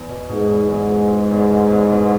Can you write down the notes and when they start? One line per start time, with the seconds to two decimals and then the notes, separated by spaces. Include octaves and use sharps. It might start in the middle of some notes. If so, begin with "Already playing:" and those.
Already playing: E2
0.09 B2
0.29 G#2 B2
0.50 E2
0.70 E2 G#2
0.90 G#3
1.11 G#3
1.31 E2
1.51 B2
1.72 E2
1.92 B2